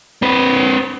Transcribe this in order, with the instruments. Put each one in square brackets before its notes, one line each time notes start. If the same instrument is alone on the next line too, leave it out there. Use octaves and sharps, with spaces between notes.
[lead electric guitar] C4 B4